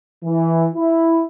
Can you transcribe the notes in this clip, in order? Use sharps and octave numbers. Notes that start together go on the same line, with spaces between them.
E3
E4